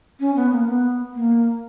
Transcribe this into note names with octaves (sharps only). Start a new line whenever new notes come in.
C#4
B3
A#3
B3
A#3